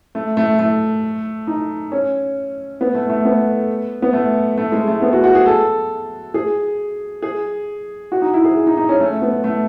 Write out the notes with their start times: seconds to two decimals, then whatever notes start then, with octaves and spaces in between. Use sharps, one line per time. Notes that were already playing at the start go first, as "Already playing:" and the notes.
0.15 A3
0.37 A3
0.59 A3
1.47 D#4
1.92 C#4
2.81 B3
2.95 A3
3.10 A3
3.25 B3
4.02 B3
4.13 A3
4.57 A3
4.72 G#3
4.87 A3
5.02 B3
5.13 F#4
5.24 F#4
5.35 G#4
5.46 A4
6.34 G#4
7.22 G#4
8.12 F#4
8.22 D#4
8.33 E4
8.45 G#4
8.67 D#4
8.77 D#4
8.89 C#4
9.00 A3
9.22 B3
9.44 A3